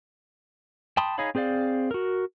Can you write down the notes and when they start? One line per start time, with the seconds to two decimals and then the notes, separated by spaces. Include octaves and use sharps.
0.97 G5 A5 B5 C6 D#6
1.18 D#4 G#4 C#5 F5 B5
1.35 C4 G#4 C5 D5 F5
1.91 F#4 A#4